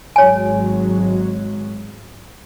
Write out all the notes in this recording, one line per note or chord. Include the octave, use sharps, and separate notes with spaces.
G#1 F#3 G#3 C#5 G#5